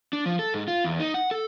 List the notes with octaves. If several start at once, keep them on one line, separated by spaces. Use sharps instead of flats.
D4
F3
A4
G#2
F4
E2
D#4
F#5
A4